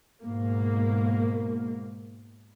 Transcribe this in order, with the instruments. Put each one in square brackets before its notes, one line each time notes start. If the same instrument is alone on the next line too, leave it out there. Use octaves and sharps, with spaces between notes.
[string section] G#2 B2 A#3